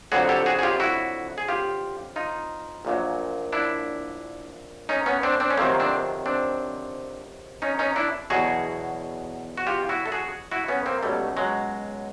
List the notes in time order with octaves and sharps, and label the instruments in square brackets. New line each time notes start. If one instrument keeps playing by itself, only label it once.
[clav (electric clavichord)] F2 D3 F#3 F#4 G#4
G4 A4
F#4 G#4
G#4
F4 G4
E4 F#4
G#4
F4 G4
D#4 F4
A#1 A#2 F#3
D4 E4
C#4 D#4
B3 C#4
C4 D4
C4 D4
C#4
F2 C3 D#3 F#3 A#3 C4
C4 D4
C4 D4
C#4 D#4
C#4 D#4
D4 E4
E2 B2 F#3 F#4 G#4
F#4
F4 G4
E4 F#4
A4
F#4 G#4
E4 F#4
B3 C#4
A#3 C4
C#2 B2 F#3 G3 A3
F#3 G#3